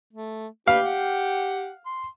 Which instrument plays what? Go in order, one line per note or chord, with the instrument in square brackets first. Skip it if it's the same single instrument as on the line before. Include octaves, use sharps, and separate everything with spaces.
[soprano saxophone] A3
[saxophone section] G4 [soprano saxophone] B4 [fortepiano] F5
[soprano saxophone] F#5
C6